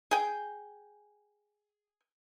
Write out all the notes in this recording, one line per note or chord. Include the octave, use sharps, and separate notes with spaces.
G#4 G5